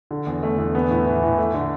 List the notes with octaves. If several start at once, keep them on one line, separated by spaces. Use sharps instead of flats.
D3
E2
A3
E2
B3
A2
E3
A2
A3
D3